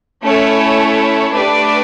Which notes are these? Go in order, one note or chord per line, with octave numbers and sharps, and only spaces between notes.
A3 C#4 E4 A4 C#5
A3 D4 G4 B4 D5